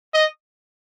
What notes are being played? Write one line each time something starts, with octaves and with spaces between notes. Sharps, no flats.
D#5